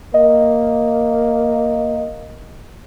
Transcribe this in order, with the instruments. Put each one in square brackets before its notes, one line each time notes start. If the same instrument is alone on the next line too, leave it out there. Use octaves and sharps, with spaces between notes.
[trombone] A#3 [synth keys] D#5